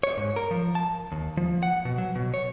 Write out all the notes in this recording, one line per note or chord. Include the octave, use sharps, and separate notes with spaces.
C#5
G#2
A#4
F3
A5
D#2
F3
F#5
B2
F#3
B2
C#5